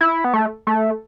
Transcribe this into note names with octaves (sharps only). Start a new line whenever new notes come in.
E4
B3
A3
A3